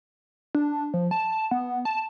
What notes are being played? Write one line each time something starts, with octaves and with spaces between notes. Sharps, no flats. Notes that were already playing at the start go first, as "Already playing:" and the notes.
D4
F3
A5
B3
A5